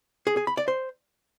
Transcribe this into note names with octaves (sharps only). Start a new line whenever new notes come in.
G#4
G#4
B5
D5
C5